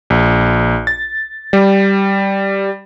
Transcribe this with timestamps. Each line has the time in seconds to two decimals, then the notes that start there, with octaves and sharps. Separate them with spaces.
0.10 A#1
0.87 A6
1.53 G3